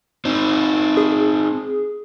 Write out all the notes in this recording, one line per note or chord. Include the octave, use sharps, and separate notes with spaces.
C4 D#4
G#4